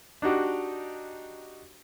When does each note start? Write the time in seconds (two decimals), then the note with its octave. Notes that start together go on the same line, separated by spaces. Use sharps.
0.22 D4 D#4 F#4 G4